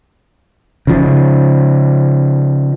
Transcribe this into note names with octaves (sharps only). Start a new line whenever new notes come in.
C#3 F3